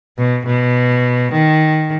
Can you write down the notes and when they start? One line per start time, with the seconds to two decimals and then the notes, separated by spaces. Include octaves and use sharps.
0.18 B2
0.47 B2
1.33 D#3